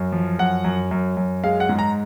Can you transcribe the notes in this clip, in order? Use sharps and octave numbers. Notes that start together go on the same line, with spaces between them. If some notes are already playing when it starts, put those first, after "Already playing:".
Already playing: F#2
F3
F#2 F#5
F#2
F#2
F#2
G#3 F5
F#5
G#2
A#5